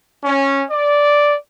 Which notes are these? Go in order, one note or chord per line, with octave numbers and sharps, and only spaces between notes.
C#4
D5